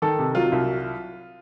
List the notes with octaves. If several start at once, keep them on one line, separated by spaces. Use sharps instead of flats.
D#3 A4
C3
F#3 F4
C2